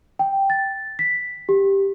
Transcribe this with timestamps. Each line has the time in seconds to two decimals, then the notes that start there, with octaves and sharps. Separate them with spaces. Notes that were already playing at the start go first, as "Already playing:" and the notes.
0.19 G5
0.50 A6
0.99 B6
1.49 G4